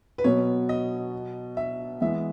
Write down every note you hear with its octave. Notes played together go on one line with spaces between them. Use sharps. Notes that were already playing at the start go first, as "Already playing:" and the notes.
B4
B2 F#3 B3 C#5
D#5
E5
E3 G#3 B3 E5